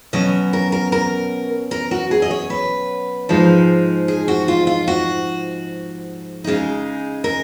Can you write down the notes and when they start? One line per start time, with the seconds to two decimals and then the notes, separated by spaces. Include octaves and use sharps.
0.13 B2 F#3 C#4 D#5
0.53 A#4
0.72 A#4
0.92 A#4
1.71 A#4
1.91 F#4
2.11 G#4
2.22 D#5
2.31 C#5
2.50 B4
3.29 G#2 F3 G#3 D#4
4.08 G#4
4.28 F#4
4.48 F4
4.67 F4
4.88 F#4
6.44 C#3 G#3 D#4
7.24 A#4